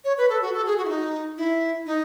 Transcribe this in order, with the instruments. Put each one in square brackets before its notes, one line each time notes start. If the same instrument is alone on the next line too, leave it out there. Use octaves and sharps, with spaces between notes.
[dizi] C#5
B4
A4
F#4
A4
G#4
F#4
E4
D#4
E4
D#4